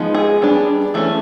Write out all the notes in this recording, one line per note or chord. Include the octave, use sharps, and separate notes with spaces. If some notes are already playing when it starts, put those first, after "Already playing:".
Already playing: F3 G#3 B3 D#4
G#4
G3 B3 D4
E3 A3 C#4